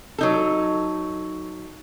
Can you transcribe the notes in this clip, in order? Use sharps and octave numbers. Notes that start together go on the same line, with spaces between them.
F#3 D#4 A4